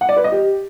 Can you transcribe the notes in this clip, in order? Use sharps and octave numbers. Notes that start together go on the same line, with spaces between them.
F#5
D5
B4
D#5
G4